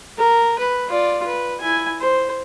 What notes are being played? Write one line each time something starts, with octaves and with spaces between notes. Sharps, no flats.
A#4
B4
F4 D5
B4
E4 G#5
C5